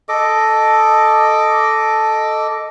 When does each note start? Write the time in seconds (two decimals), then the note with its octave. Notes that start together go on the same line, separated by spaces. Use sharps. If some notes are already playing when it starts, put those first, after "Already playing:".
0.09 A4 D#5 D6